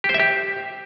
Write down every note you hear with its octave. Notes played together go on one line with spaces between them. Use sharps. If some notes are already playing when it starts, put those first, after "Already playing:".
G4
C5
E5
G4